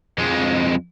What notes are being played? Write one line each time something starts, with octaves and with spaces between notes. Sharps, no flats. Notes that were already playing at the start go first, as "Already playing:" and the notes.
F2 G#3